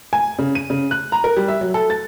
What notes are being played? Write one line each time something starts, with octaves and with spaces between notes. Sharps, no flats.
G#5
C#3
D#7
C#3
F#6
A#5
A#4
G3
E5
F#3
A4
A6